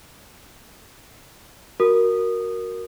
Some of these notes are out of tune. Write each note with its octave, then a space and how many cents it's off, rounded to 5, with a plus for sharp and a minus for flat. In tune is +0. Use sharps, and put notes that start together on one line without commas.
F#4 +0 A#4 +0 D#6 -15